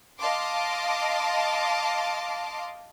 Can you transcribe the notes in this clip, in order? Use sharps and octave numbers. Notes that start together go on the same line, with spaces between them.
D#5 F5 A5 C6 D6